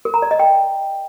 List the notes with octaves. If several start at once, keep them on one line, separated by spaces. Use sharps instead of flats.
A#4
A#5
D5
D#5
G5